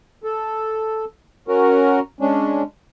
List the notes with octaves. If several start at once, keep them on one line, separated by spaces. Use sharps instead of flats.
A4
C#4 F#4 A#4
G#3 C#4 D4